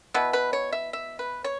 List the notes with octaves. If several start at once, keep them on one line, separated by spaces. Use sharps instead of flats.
B2 B3 E4 B4
B4
C#5
E5
E5
B4
C#5